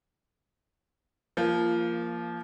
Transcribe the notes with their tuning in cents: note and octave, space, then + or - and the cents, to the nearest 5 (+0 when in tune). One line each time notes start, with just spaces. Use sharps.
F3 -20 A#3 +0